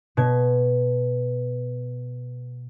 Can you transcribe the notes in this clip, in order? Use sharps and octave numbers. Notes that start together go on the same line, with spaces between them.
B2 G#6